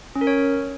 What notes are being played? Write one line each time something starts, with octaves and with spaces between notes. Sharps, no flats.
C#4
A#4
C#5